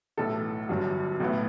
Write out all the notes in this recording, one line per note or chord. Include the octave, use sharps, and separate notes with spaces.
B1 A2 E3 A4
G1 G2 F#3
B1 A2 E3 B3